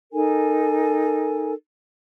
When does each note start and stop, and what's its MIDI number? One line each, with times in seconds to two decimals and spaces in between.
0.12 1.53 63
0.12 1.53 69
0.12 1.53 70
0.12 1.53 80